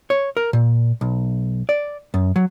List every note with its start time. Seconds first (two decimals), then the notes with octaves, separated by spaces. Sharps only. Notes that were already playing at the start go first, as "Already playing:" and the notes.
0.10 C#5
0.37 A#4
0.53 A#2
1.01 B1
1.69 D5
2.14 F#2
2.36 F#3